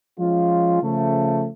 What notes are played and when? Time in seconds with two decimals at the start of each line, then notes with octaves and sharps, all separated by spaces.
0.17 F3 G#3 C#4 F4
0.82 C#3 F3 A3